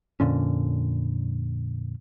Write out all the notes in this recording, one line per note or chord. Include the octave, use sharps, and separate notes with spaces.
F2 A#2 D3 C#4